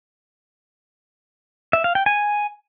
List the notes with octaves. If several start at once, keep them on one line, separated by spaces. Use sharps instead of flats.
E5
F5
G5
G#5